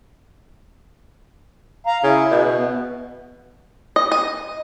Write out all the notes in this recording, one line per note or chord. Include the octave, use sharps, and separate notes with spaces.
F5 A#5
C#3 E4
B2
B3
D#5
D#5